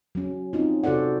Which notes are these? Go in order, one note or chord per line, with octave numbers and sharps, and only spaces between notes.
F#3 C#4
C4 C#4 D#4 F4
C3 F#4 A4 C5 D5 F#5